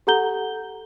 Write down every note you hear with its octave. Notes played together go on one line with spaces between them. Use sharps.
G4 A4 F#5 A#5 G6 G7